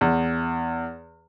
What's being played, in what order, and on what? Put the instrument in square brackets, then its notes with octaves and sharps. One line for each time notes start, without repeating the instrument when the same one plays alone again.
[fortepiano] E2